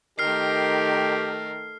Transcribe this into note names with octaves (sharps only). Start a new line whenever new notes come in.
D#3 A3 G4 A#4 F6 C7